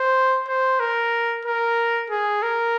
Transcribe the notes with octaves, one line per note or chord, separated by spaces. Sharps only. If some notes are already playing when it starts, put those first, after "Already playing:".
Already playing: C5
C5
A#4
A#4
G#4
A#4